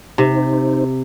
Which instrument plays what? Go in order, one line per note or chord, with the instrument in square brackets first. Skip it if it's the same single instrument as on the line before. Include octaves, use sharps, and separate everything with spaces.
[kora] C3 [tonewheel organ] D#4 C5